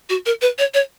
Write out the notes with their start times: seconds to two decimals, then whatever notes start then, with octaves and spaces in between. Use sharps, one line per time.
0.10 F#4
0.26 A#4
0.42 B4
0.59 C#5
0.74 C#5